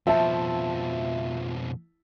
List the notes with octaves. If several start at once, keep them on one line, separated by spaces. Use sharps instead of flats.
F2 B2 F3 E5 A5